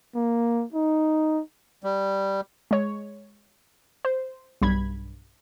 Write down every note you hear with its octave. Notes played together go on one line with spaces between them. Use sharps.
A#3
D#4
G3
G#3 C#5
C5
B1 G2 B5 G#6